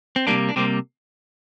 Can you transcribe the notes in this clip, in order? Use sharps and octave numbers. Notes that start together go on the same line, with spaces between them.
C4
C3 G3 A#3 D4
D4
C3 G3 A#3 C4